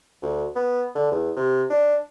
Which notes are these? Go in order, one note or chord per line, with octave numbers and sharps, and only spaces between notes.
D2
B3
D3
E2
C3
D4